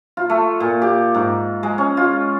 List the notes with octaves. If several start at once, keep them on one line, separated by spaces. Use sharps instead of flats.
F4
A3
A#2
G4
G#2
G#3
C#4
F4